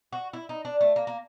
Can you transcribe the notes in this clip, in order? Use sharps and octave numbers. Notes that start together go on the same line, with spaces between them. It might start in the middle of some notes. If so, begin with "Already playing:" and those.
F#4
E4
D#4
D4
A3
A#3
A#3